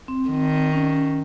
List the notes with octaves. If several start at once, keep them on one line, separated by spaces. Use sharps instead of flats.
C4
D#3 C4
C#4